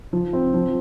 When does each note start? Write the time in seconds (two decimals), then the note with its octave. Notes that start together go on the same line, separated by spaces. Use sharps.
0.13 F3
0.33 C4
0.54 F3